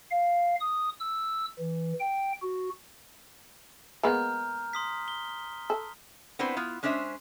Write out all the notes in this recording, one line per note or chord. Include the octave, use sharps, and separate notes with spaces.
F5
D#6
E6
E3
G5
F#4
G#3 A#3 B3 A#5 F6 G6
C6 D#6 B6
G7
A4
B3 C4 D4 E4 C5
B3 E4 F4
G#3 C#4 D4 C5 E5